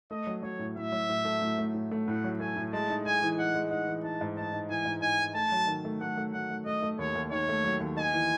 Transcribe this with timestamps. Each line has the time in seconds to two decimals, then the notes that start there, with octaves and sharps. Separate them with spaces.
0.11 A3 D#5
0.27 F#3
0.43 F#3 C#5
0.59 A2
0.76 A2 E5
0.92 F#3
1.09 A2
1.25 A3
1.42 A2
1.59 A3
1.74 A2
1.91 A3
2.07 A2 F#5
2.24 F#3
2.40 A3 G#5
2.56 A2
2.72 G#3 A5
2.90 D#4
3.06 G#3 G#5
3.22 E3
3.39 D#4 F#5
3.55 G#3
3.71 D#4 F#5
3.87 E3
4.04 D#4 A5
4.21 G#2
4.37 D#4 A5
4.53 D#4
4.69 E3 G#5
4.85 G#2
5.02 D#4 G#5
5.19 D#4
5.35 A3 A5
5.52 F#3
5.67 D#3
5.85 A3
6.01 A3 F#5
6.18 A3
6.33 F#3 F#5
6.50 A3
6.66 A3 D#5
6.82 A3
6.99 D#2 C#5
7.15 D#2
7.31 D#3 C#5
7.49 A3
7.64 F#3
7.80 D#2
7.97 D#4 G#5
8.13 E3